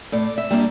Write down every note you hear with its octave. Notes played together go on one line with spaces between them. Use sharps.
A2 D5
E5
G3 A#3 D4